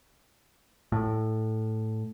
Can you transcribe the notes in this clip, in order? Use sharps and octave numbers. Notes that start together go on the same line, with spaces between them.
A2